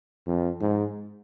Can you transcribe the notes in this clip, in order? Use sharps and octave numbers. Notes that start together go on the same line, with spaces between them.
F2
G#2